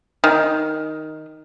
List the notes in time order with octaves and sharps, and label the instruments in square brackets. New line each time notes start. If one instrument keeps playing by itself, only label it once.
[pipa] D#3